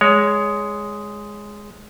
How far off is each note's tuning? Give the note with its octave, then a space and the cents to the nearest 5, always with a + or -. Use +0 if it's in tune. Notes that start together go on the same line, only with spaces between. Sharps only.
G#3 +0 C#5 +20